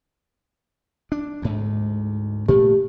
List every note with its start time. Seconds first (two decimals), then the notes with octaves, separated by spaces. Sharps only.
1.12 D4
1.42 D2 G#2
2.48 A#2 A3 G4